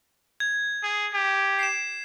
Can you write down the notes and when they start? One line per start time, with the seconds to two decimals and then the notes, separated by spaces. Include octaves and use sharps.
0.40 G#6
0.83 G#4
1.14 G4
1.59 C7 E7